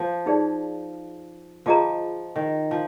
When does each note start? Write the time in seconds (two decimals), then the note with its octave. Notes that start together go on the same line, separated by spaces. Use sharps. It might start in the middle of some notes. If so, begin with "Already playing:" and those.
Already playing: F3
0.26 D#4 G#4 D5
1.66 F3 F4 G#4 D#5 A#5
2.36 D#3
2.71 F3